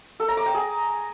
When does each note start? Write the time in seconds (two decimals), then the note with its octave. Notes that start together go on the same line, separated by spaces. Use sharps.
0.20 A4
0.28 A#5
0.37 D6
0.46 G5
0.54 G#4